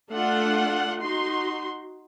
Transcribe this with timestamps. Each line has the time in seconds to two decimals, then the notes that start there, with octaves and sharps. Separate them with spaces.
0.12 A3 D4 F4 A4 F#5
1.01 D#4 F#4 C6